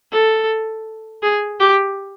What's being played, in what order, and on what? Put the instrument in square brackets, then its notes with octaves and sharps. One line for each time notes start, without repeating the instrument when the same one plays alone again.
[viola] A4
G#4
G4